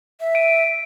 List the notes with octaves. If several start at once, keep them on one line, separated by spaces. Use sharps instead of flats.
E5
D7 D#7